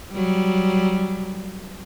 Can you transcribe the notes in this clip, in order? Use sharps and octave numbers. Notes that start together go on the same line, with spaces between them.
F#3 G3